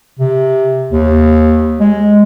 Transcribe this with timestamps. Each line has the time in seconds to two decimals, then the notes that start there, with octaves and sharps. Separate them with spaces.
0.19 C3
0.91 D#2
1.80 G#3